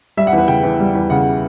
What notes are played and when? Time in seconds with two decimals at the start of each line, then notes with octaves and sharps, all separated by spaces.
0.17 G3 E5
0.27 F#5
0.33 E2
0.38 B4
0.48 C#3 G5
0.64 E2
0.80 G3
0.95 E2
1.10 C#3 F#5